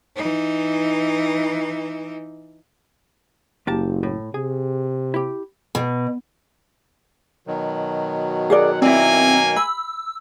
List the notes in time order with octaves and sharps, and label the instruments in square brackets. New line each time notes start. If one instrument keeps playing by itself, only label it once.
[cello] E3 D#4
[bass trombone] F#1 [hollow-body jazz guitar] A#3 G4 A5
[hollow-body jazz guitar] A2
[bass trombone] C3 [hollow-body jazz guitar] G#4
[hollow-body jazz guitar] E4 G4
[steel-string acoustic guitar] B2
[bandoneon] B2 D#3 F#3
[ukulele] G#4 A#4 D5 [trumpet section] F#5
[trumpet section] A#3 G#5 [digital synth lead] C4 [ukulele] E4 D5
[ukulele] B5 [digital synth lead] E6